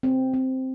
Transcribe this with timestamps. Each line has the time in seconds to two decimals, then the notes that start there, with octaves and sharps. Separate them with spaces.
0.03 C4
0.34 C4